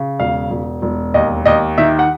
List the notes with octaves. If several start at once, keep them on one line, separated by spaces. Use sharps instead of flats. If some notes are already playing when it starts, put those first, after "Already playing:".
Already playing: C#3
E1 F5
E1
E1
D#2 D#5
D#2 D#5
D#3 E5
F#5